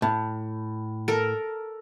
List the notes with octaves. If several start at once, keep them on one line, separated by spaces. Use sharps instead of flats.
A2
A4 A#4